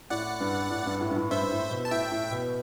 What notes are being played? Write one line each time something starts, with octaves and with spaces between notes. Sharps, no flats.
A2 D5 F#5
G2
A2
G2
A2
G2
A2
G2 C5 E5
G2
A2
B2
A5
A2 E5 G5
A2
B2